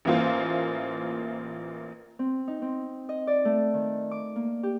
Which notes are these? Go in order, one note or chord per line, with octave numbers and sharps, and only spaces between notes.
A1 E3 A#3 F4 C5
C4
D#4
C4
D#5
D5
A3
D#3
D6
A#3
G4